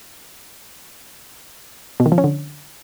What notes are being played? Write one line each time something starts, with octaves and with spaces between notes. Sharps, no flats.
B2
D#3
F3
C#4
D3